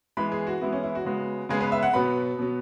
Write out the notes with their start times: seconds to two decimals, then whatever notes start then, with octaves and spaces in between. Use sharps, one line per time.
0.17 E3 G#3 B3 B5
0.32 G#4
0.47 F#4
0.61 E3 G#3 B3 E4
0.73 C#4
0.83 E4
0.95 F#4
1.05 C#3 G#3 B3
1.49 C#3 G#3 B3 G#4
1.60 B4
1.72 E5
1.83 F#5
1.93 B2 F#3 B3 B5
2.39 B2 F#3 B3